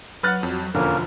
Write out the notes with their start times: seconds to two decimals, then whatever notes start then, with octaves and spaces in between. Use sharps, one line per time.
0.23 F#3 B4 F#5 F6 F#6 A6
0.43 F2
0.75 E1 F2 D3 F3 A#3 C#4 A#4